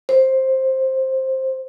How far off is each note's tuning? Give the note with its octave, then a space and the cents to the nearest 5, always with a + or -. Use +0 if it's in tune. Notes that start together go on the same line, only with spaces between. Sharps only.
C5 +10